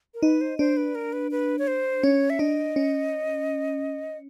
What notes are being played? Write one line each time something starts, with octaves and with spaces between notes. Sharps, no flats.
A#4
D#4 B4
C5
D4 C5
B4
A#4
B4
B4
C#5
C5
C#4 C#5
E5
D4 D#5
C#4